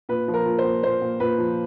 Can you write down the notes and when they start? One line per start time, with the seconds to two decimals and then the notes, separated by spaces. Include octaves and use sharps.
0.09 A#2 B4
0.28 F3
0.34 A#4
0.46 A#2
0.58 C5
0.64 A#2
0.83 A#2 C5
1.01 A#2
1.20 A#2 B4
1.38 F3